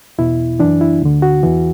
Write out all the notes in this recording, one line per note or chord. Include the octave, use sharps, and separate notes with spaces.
E2 B2 E4
F#2 E3 D4
E4
D2 D3
F#4
E2 E3